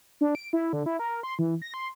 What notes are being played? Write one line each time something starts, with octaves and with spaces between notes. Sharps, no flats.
D4
D7
E4
D3
E4
A#4
C6
E3
A#6
C6